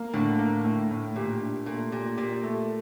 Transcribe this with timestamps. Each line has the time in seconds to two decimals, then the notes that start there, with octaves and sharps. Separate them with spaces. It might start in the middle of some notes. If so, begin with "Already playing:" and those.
Already playing: A#3
0.14 A2 D3
0.39 A#3
0.65 A2
0.91 A2
1.16 A#2 G4
1.41 D4
1.66 A#2 A3
1.92 A#2 G4
2.17 A#2 G4
2.43 A3